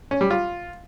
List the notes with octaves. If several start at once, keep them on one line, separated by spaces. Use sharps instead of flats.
C#4
G3
F4